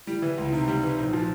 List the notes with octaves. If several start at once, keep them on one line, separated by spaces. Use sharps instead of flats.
G3 E4
E3
C#2
C3 D#4
G3
E3
A#1
F3